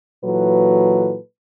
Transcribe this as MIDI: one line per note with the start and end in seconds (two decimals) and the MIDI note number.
0.23 1.16 46
0.23 1.16 52
0.23 1.16 54
0.23 1.16 69
0.23 1.16 71